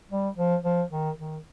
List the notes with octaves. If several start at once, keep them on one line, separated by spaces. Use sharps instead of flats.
G3
F3
F3
D#3
D#3